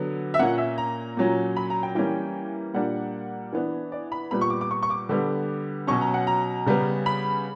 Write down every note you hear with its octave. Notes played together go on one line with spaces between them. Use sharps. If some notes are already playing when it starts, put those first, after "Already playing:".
Already playing: D3 F#3 B3
E5
A#2 A#3 C#4 F#5
E5
A#5
A#2 F#3 C#4
B5
A#5
G5
E3 G3 A#3 C#4 G5
A#2 G3 A#3 D4 F#5
E3 B3 D4
D5
B5
A#2 G3 B3 B5
C#6
D6
D6
C#6
C#6
D6
D3 G3 B3
B2 F#3 C#4 C#6
A#5
F#5
A#5
C#3 G3 B3
B5